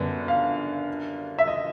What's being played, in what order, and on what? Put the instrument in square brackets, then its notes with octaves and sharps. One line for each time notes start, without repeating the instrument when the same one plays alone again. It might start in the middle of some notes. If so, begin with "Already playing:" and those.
Already playing: [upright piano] F#2 D3 G3 B3 D4
[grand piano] F5
E5
D#5